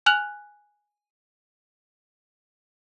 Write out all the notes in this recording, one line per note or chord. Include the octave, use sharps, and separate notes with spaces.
G#5 F6 F#6 F7 F#7